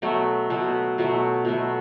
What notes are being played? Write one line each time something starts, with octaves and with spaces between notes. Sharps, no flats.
B2 F#3 A3
B2 F#3 A3
B2 F#3 A3
B2 F#3 A3